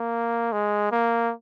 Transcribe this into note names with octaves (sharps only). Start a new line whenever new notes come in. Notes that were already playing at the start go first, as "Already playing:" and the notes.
Already playing: A#3
G#3
A#3